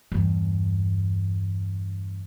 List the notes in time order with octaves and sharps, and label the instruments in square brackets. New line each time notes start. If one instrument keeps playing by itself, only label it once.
[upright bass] E2 G2